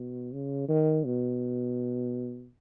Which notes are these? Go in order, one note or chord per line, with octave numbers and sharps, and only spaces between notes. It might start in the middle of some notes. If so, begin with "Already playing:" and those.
Already playing: B2
C#3
D#3
B2